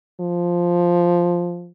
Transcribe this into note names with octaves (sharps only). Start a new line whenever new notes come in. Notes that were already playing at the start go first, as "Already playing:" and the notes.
F3